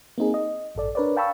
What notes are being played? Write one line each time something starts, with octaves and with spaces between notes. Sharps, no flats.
A#3 C4 D#4 G#4
D#5
A1 G2 A4 D5
D4 A#4 B4 C#5 D5
F5 G5 A5 B5 C#6 E6